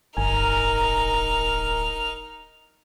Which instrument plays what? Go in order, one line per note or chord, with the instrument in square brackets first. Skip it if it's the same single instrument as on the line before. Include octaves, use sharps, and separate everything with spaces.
[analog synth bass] D1 [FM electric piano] G1 G#5 [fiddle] D#4 F6 [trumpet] A#4